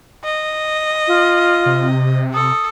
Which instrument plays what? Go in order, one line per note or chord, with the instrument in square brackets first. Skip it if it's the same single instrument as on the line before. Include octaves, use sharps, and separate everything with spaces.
[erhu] D#5
[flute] F4
[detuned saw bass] C3
[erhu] A4 [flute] D#6